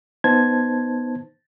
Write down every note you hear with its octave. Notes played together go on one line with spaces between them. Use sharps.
B3 D#4 C5 A5 G#6